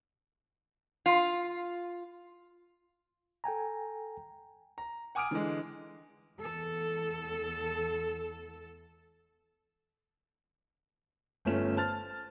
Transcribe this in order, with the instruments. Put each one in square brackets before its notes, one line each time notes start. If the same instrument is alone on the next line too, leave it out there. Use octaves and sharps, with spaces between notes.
[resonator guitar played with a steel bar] F4
[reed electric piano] A4 G5 G#5 A#5
[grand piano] A#5
F#5 G#5 D6 D#6 F6 D7
D3 E3 G#3
[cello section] E2 A4
[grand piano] G1 A3 C#4 F4 E7
C5 A5 F6 A6